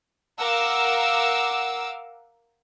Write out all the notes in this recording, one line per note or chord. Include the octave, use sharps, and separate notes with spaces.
A#4 F5 F#5 D6 E6